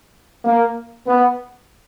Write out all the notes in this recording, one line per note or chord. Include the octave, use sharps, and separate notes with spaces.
A#3
B3